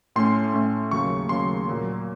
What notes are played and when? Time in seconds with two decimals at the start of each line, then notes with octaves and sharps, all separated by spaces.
0.16 A2 A3 C#4 C6
0.54 A2 A3 C#4
0.91 D#2 C#3 F#3 A#3 C#6
1.29 D#2 C#3 F#3 A#3 C6
1.68 A#2 F#3 A#3